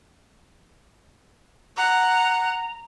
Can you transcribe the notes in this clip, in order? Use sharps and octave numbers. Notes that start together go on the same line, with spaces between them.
F#5 A#5